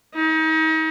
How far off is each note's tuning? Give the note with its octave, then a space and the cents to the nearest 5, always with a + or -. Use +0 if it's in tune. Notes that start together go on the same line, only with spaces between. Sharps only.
D#4 +35